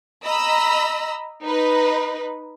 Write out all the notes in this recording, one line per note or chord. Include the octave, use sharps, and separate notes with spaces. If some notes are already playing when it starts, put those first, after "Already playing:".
D#5 A#5 B5 E6
D#4 B4